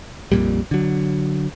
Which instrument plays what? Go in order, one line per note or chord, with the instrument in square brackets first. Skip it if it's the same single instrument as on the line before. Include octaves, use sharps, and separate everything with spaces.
[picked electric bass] A#1 F2 A#2 G3
D3 F#3